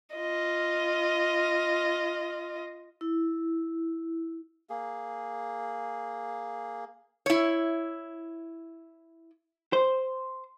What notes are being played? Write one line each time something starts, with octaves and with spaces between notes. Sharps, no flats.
F4 D#5
E4
A#3 G#4
E4 C#5
C5